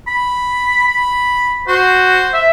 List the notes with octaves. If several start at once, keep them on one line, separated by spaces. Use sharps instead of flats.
B5
B5
F#4 C5
E5